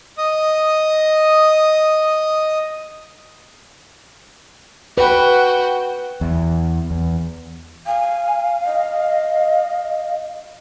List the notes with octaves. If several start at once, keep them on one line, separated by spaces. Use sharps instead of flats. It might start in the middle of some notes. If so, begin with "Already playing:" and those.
D#5 D#6
F#4 B4 G5
E2
E2
F5 G#5
D#5